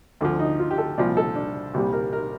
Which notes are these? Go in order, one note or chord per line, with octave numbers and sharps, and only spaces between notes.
D2 D3 F3
D#4
F4
G4
A4
C2 A#2 F3 D5
A4
D4
C2 A#2 G3 G4
A#4
A#4